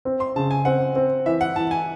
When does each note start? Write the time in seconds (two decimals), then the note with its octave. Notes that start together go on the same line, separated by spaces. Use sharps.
0.05 C4
0.20 C6
0.36 C#3 A5
0.51 G#5
0.65 C4 F#5
0.96 C4
1.26 E3 E5
1.41 F#5
1.56 E3 A5
1.71 G#5